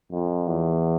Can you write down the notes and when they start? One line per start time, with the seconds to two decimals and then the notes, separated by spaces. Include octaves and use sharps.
0.11 F2
0.47 E2